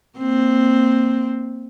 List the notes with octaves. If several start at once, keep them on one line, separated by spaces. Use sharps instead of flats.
A#3 C4